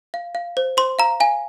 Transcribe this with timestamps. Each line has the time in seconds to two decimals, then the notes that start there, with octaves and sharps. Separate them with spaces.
0.14 F5
0.35 F5
0.57 C5
0.77 C5 C6
0.99 F5 A#5
1.20 F5 G#5